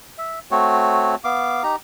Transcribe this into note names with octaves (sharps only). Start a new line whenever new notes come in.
E5
A3 C4 F#4 C#5
B3 F5 D6
D#4 G4 A#5